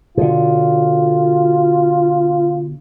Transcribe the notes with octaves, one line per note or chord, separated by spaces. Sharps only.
B2 D3 F4